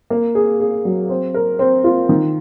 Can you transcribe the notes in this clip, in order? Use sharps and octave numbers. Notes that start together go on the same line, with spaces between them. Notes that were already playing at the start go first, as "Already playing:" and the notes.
A#3
G#4
G#4
F#3
C4
A#4
C4
F4
D#3